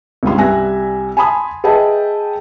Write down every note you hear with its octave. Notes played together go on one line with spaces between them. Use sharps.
C#2 G2 C#4 C6
C2 G3 E5 G#5 F#6 A#6
G#5 A5 B5 C6 D#6
G#4 B4 D#5 E5 G5 A5